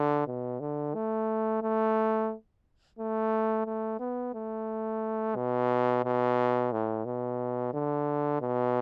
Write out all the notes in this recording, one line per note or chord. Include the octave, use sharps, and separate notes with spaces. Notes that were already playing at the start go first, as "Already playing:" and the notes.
Already playing: D3
B2
D3
A3
A3
A3
A3
B3
A3
B2
B2
A2
B2
D3
B2